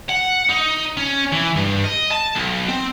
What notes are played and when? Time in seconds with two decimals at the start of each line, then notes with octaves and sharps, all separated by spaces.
0.09 F#5
0.50 D#4
0.97 C#4
1.32 E3
1.56 G2
1.84 D#5
2.11 A5
2.35 B1
2.68 C4